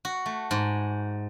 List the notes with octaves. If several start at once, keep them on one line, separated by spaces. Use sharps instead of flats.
F#4
A3
G#2